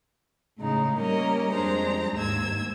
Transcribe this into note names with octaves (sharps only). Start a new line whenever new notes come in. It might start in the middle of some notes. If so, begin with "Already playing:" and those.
A2 C#3 G#3 D#4
G3 A#3 C#4 A#4 D#5
F2 G3 G#3 D4 C5 A#5
D#2 G#2 E6 G#6